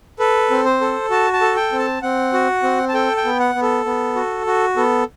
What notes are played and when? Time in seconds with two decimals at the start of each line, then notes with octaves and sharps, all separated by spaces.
0.19 A4 B4
0.50 C4
0.65 C5
0.81 A4
1.10 F#4 A5
1.33 A5
1.41 A4
1.56 G5
1.72 C4
1.79 A5
2.02 C4 F#5
2.33 F#4
2.63 C4
2.89 A5
2.94 A4 G5
3.17 G5
3.25 B3
3.40 F#5
3.55 B3
3.62 A4
3.85 B3
4.15 F#4
4.47 F#4
4.77 B3 A4